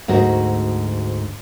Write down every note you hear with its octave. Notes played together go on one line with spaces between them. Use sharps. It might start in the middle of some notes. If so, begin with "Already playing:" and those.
D2 G#2 F#4 A#4